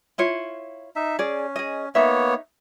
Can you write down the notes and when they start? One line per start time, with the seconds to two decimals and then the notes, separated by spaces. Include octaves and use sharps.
0.18 E4 F4 C#5
0.96 D#4 E5
1.19 C#4 G#4 D5
1.56 G#4 D#5
1.95 A#3 B3 D#4 C#5 E5